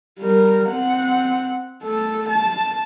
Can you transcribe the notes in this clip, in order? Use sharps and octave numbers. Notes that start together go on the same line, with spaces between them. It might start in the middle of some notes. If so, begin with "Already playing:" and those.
G3 A#4
C4 F#5
A3 A4
A5